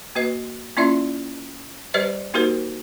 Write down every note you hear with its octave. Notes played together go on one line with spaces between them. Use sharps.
A#3 F#4 B4 D#5
A#3 C#4 E4 F4 D5 E5
G3 G4 B4 C5 D5 D#5
A#3 D#4 F#4 G4 A#4 C5